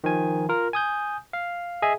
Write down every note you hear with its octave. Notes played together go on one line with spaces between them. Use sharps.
D#3 F3 G#5
F4 A#4
G#5 D#6 G6
F5
G#4 D#5 E5 G#5